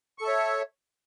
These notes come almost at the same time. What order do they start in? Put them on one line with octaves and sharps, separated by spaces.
C#6 A4 E5 C#5